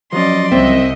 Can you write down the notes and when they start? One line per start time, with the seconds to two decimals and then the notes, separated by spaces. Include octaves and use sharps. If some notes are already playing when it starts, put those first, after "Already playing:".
0.13 F3 F#3 C#4 D5 D#5 C6
0.52 C2 C4 D#5 E5